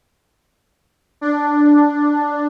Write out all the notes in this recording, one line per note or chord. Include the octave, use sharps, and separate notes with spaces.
D4